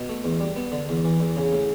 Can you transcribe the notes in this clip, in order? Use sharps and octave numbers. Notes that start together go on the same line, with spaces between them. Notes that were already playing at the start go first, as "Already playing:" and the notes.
Already playing: B2
A3
E2
G3
B3
D3
E2
E3
E2
C#3
A2